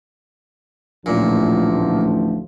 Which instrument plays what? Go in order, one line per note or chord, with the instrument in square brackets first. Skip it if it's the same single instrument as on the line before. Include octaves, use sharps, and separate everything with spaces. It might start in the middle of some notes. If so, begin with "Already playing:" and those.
[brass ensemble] A1 D2 F3 [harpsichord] A#2